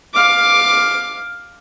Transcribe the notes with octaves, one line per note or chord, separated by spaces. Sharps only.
F5 D6